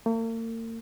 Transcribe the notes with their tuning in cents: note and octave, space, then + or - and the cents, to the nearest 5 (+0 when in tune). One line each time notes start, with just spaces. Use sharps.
A#3 -45